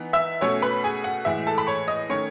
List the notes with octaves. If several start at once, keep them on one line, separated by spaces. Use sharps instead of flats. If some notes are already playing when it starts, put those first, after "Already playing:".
Already playing: E3 B3 D#4
E5 E6
B2 A3 C#4 C#5 C#6
B4 B5
G#4 G#5
F#5
A2 E3 G#3 E5
A4 A5
B5
C#5 C#6
D#5 D#6
D#3 A3 C#4 C#5 C#6